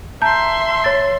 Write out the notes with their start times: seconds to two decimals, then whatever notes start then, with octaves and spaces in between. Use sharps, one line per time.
0.22 E5 A5 A#5 C6 G6
0.84 C#5 A6